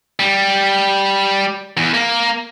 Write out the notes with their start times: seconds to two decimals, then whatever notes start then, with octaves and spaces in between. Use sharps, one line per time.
0.20 G3
1.77 E2
1.94 A#3